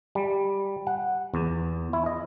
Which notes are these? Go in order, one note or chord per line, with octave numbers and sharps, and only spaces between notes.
G3
F#5
E2
E4
D#5